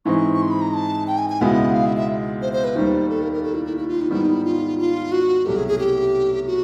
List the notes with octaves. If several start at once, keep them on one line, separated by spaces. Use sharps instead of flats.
G#2 E3 G#3 C4 C#6
C#6
C6
B5
A#5
A5
G5
G#5
G#5
C#2 B2 G#3 B3 E4 F#5
F5
E5
E5
C5
C5
B4
D#2 D#3 G3 C5
A4
A#4
A#4
A4
E4
E4
E4
F4
D#4
G#2 D#3 G3 B3 E4
D#4
E4
F4
F4
F#4
C2 B2 F#3 A3 G4
G#4
G#4
G4
F#4